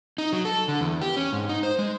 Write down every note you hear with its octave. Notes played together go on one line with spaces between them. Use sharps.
D#4
F#3
A4
D3
E2
G4
C#4
G#2
D#4
C5
G#3